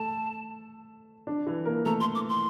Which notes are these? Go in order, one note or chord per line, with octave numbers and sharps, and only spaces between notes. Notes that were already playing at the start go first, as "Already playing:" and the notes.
Already playing: A3 A4 A5
D4
E3 E4
A#3 A#4
A3 A4 A#5
C6
D6
C6